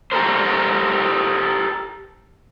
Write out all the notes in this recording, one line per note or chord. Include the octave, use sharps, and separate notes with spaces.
G4 A4 A#4 C5